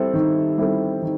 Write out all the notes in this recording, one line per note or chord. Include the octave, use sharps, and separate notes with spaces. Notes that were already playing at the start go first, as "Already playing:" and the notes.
Already playing: G3 C4 E4 A4
D#3
G3 C4 E4 A4
D#3